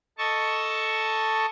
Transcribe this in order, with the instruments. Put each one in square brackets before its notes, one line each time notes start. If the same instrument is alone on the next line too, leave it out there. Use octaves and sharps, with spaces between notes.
[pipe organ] A4 D#5 A5 C#6